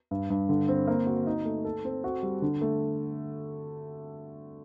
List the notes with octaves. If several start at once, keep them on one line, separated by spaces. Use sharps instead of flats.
G2
G2
D3
C4
A#3
F#4
D#4
A3
A4
C4
F#4
G3
D3
A3